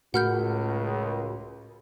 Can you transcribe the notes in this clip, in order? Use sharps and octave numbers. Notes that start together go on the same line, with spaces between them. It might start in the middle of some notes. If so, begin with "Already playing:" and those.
C#2 A2 F#4 A#4 F#5 B5 F6 G6